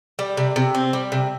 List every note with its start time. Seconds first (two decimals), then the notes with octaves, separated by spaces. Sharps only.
0.19 G3
0.37 C3
0.56 C3
0.75 C4
0.93 G3
1.12 C3